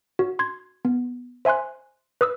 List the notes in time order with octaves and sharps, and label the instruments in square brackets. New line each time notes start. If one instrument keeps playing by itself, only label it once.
[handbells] F#4
C6 G#6
B3
C5 E5 G#5 C6 F#6
B4 D#6 E6